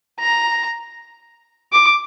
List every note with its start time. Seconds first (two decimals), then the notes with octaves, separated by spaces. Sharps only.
0.20 A#5
1.73 D6